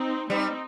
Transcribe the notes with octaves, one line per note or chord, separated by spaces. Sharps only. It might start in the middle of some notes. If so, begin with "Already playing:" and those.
Already playing: C4 D#4
G3 C4 D#4